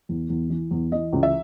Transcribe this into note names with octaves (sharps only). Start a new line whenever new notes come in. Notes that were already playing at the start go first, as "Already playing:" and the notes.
E2
E2
E3
E2
E3 D#5
C#2
E5